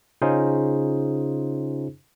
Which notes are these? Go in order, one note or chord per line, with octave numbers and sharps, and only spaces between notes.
C#3 C#4 D#4 F4 G#4 C5